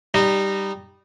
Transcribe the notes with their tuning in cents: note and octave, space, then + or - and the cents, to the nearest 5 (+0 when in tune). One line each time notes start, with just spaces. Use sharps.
G3 +0 D#4 -20